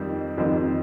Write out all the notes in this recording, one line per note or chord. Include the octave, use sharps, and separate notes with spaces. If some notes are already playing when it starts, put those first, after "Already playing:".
Already playing: F2 D#3 G3 C4 F4
F2 D#3 G3 C4 F4